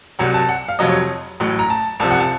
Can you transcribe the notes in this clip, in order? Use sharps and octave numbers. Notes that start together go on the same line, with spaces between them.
C2 C3 F#3 F#5
A5
F#5
F5
F1 F2 C3 F#3 D#5
C#5
A1 A2 F#3
A#5
A5
C2 C3 F3 A5
F#5
A5